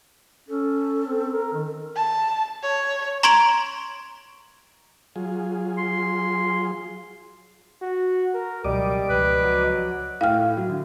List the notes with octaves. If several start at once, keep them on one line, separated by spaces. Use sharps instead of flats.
C#4 A4
C4
A#4
D#3
A5
C#5
A#5 C6 C#6 G#6 D7 F7
F#3 F4 G#4
C6
F#4
A#4
C#2 B2 F#3 G3 D5 D#5 D6
C#2 F3 B4
F#3
A2 A3 F5 G5 F6
F#3
D3